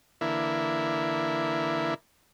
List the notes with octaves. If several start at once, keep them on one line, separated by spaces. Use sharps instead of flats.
D3 E3 A#3 E4